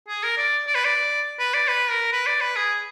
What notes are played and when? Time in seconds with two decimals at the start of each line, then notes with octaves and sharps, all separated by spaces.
0.08 G#4
0.23 A#4
0.38 D5
0.67 D5
0.75 B4
0.85 D5
1.39 B4
1.54 D5
1.68 B4
1.90 A#4
2.12 B4
2.27 D5
2.41 B4
2.56 G#4